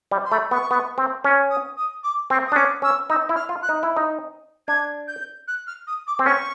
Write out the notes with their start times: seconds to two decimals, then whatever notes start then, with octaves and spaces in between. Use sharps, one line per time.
0.11 G3
0.25 C6
0.31 A3 B5
0.51 B3 C#6
0.71 B3
0.98 C4
1.25 C#4
1.50 D#6
1.77 D#6
2.03 D6
2.30 C4 C#6
2.46 D#6
2.52 D4
2.56 C#4 D6
2.82 C#4 E6
3.09 D#4 E6
3.29 E4
3.35 F6
3.49 F4
3.62 F#6
3.69 D#4
3.83 E4
3.96 D#4
4.68 D4 G#6
5.07 G6
5.47 F#6
5.67 F6
5.87 D#6
6.07 D6
6.19 C4
6.26 C#4 C#6